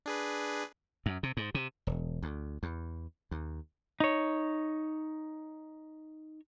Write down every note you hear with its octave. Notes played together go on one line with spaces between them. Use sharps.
D4 G#4 B4
F#2
C3
G#2
C3
E1
D2
E2
D#2
D#4 C#5